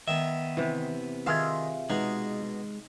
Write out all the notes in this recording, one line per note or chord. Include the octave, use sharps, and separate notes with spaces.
D#3 B3 E5
C3 E3
D#3 F4 G#4 E5 F5
B2 G#3 D#4